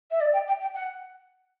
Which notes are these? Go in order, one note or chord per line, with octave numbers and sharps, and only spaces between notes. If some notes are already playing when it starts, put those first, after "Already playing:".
E5
D5
G5
G5
G5
F#5